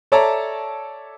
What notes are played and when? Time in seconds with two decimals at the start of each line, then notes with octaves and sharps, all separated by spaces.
0.12 A4 C#5 D5 E5 A5 A#5